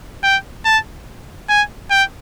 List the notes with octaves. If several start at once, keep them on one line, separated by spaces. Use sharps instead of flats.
G5
A5
G#5
G5